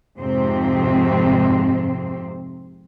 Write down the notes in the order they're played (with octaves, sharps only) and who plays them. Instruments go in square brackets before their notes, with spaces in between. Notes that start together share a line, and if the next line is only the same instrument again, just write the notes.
[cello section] F2 G#2 C3 C4